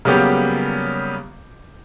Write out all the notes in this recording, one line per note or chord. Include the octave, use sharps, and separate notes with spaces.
C#3 F#3 G3 A#3 B3 G4